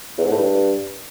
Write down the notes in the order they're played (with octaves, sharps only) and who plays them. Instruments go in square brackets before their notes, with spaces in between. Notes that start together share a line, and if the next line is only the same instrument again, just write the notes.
[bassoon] E2
G#2
A2
G2